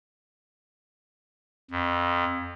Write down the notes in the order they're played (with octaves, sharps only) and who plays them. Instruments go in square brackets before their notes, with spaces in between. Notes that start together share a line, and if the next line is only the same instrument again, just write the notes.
[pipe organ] F2